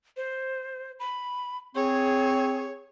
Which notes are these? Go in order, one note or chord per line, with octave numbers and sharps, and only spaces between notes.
C5
B5
C4 G#4 C#5